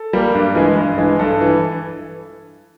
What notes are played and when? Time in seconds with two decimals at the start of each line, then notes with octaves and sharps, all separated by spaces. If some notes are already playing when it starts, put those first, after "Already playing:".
Already playing: A4
0.13 G3 A#3
0.34 G2
0.55 E3 G#3
0.76 G2
0.98 E3 G#3
1.19 G2 A4
1.41 E3